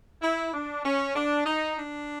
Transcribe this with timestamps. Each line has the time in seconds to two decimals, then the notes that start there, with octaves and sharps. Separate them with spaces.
0.22 E4
0.54 D4
0.84 C#4
1.16 D4
1.46 D#4
1.76 D4